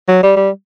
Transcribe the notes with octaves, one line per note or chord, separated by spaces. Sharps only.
F#3
G3
G3